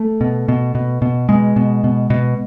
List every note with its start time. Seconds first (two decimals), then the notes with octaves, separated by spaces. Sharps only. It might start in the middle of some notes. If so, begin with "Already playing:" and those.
Already playing: A3
0.21 B2
0.48 B2
0.75 B2
1.02 B2
1.29 B2 G#3
1.56 B2
1.84 B2
2.10 B2